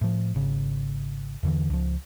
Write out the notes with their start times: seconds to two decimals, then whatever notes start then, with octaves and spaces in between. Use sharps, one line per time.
0.01 A2 F3
0.35 G#1 C#3
1.43 E2 D3 E3
1.70 C#2 F3